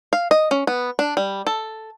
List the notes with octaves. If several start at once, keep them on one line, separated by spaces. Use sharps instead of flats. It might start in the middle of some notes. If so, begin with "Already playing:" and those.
F5
D#5
C#4
B3
D4
G3
A4